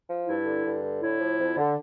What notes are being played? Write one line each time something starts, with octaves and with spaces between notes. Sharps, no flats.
F3
G2 E4
D3
G2
D3
A2 E4
F3
F2
D3